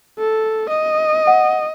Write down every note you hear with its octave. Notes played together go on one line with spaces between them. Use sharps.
A4
D#5
F#5